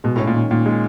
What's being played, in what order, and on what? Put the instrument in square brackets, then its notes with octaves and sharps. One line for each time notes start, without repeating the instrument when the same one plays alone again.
[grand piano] B2 [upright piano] G#3
[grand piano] A2 [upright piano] C#4
[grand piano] A#2
[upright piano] D#3
[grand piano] A#2 [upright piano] D#3
[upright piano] G#3